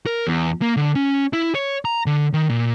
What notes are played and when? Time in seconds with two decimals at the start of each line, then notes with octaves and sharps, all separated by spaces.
0.06 A#4
0.27 E2
0.62 A#3
0.77 D3
0.95 C#4
1.33 E4
1.55 C#5
1.85 A#5
2.06 D3
2.33 D#3
2.50 A#2